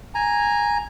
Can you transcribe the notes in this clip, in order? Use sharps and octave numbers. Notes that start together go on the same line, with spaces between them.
G#5 A#5